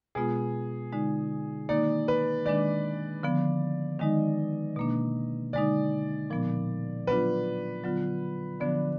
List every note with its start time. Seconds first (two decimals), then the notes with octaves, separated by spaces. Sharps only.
0.15 B2 G#3 B3 F4 G#4
0.93 D3 G#3 D#4
1.69 D#3 A#3 D#4 D5
2.08 B4
2.46 D#3 G#3 D4 D5
3.23 D3 F3 B3
3.99 D#3 G#3 D#4 D#5
4.76 B2 A#3 D4
5.53 D3 G#3 D#4 D5
6.30 A#2 F3 B3
7.07 F#3 B3 D4 F4 B4
7.84 D3 F#3 B3 F4
8.60 D3 F3 B3 D4